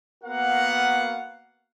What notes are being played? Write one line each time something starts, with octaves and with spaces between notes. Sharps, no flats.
A#3 B3 F#4 A#4 F5 F#5